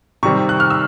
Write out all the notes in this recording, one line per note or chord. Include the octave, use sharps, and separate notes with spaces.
C3 D#3 G3 C4 C#6
F#6
F6
E6